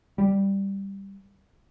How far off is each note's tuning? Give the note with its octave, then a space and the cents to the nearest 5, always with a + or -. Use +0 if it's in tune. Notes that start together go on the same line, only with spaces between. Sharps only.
G3 +5